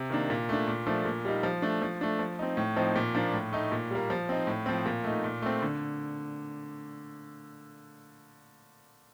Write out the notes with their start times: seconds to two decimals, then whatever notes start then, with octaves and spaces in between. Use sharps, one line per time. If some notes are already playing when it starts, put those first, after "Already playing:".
Already playing: C3
0.10 D#3 A#3 D4
0.30 A#2
0.49 A3 D4
0.68 A#2
0.87 F3 A3 D4
1.05 A#2
1.25 G3 A#3 D#4
1.43 F3
1.62 A3 D4
1.82 F3
2.01 A3 D4
2.19 F3
2.39 C4 D#4
2.57 A2
2.76 F3 C4 D#4
2.96 A#2
3.15 F3 A#3 D4
3.33 A2
3.53 A3 D#4
3.72 A#2
3.91 G3 A#3
4.10 F3
4.29 C4 D#4
4.47 A2
4.66 F3 C4
4.86 A#2
5.04 A3 D#4
5.24 A#2
5.42 A3 C4
5.62 D3